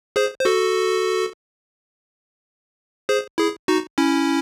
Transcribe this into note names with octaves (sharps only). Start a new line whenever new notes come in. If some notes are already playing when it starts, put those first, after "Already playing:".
G#4 C5
C5
F#4 A4
G#4 C5
E4 G#4
D#4 F#4
C#4 E4